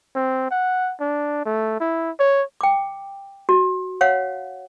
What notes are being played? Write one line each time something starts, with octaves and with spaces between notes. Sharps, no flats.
C4
F#5
D4
A3
E4
C#5
G5 D6
F#4
C#5 F5 F#5